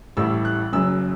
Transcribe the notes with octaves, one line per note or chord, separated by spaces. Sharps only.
A1 A2 G3 E6
F#6
F#1 F#2 C#3 F#3 E6